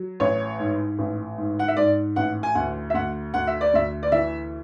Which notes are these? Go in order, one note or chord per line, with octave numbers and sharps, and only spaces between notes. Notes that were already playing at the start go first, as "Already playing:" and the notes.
Already playing: F#3
A1 C#5
G#2
A1
G#2
F#5
E5
G#2 D5
A1 F#5
G#5
D2 F#5
E5
D2 F#5
D2 F#5
E5
D5
D2 E5
D5
E3 E5